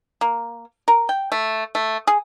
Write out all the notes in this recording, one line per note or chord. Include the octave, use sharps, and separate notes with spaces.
A#3
A#4
G5
A3
A3
G#4